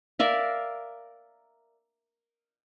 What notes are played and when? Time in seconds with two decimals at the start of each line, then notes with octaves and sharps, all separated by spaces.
0.19 A#4 D5 E5 F5